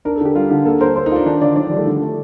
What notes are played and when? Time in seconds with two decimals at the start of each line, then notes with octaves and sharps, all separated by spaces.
0.05 D4 A#4
0.15 A4
0.21 D3 G4
0.35 G3 F4
0.51 D3
0.65 A#3 A4
0.81 A#4 C5
0.96 A4 C5
1.06 D#4
1.11 D4 F4
1.26 D#3 D4
1.41 D3 D5
1.56 D#3 D5
1.67 F3
1.71 G3
1.77 A3
1.87 D3
2.02 A3